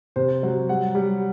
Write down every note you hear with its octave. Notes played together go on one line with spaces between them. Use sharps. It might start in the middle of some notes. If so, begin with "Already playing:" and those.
C3 C5
F#3
G3 F#5
G3